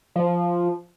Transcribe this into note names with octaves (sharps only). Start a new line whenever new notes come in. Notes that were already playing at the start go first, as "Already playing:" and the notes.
F3